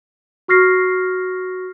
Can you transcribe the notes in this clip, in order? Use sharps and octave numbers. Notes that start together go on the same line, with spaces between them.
F#4 C#6 F6 A#6 C7